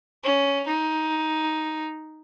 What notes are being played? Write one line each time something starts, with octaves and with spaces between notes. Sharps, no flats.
C#4
D#4